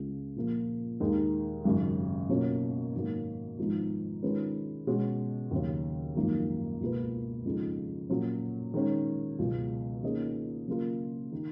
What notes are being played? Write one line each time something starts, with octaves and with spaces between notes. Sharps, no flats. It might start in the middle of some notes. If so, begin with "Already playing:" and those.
Already playing: C#2 C#3 G#3
A#2 F3 A#3
D#2 D#3 G#3 D#4 A#4
G#1 F#2 C#3
B2 F#3 A#3 C#4 F4
G#2 D#3 F#3 A#3
G#1 G#2 F3 B3 D#4
D#3 G#3 C#4 F4 B4
B2 G#3 C#4 F#4
D#2 C#3 F#3 C#4
G#1 F#2 F3 A#3 D#4
C#2 B2 A#3 F4 B4
F2 C#3 G#3 D#4
A#2 F#3 C#4 F4
D#3 G#3 C#4
C#2 B2 F#3
D#3 A#3 C#4 G#4 D#5
C#3 F#3 A#3 F4 A#4
D#3